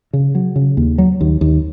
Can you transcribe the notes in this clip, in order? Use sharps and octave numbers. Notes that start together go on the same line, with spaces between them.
C#3
F#3
C#3
D#2
F#3
D#2
D#2